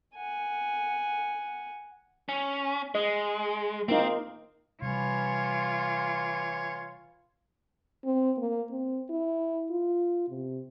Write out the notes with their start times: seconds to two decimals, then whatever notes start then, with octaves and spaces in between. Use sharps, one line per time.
0.16 F#5 G#5
2.29 C#4
2.95 G#3 D#5
3.88 A#3 C4 D#4
4.82 C3 E3 G3 F4 C#5
8.05 C4
8.37 A#3
8.71 C4
9.10 E4
9.71 F4
10.29 C3